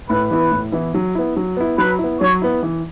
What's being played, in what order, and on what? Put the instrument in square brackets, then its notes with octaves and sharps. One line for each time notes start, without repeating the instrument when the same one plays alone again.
[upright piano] A2 [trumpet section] B4
[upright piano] E3 B3 E4
A2
E3 B3 E4
F#3
B3 E4
F#3
B3 E4
[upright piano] F#3 [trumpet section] B4
[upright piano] B3 E4
[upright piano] F#3 [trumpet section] C#5
[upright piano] B3 E4
E3